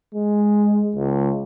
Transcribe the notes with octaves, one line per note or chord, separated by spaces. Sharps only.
G#3
C#2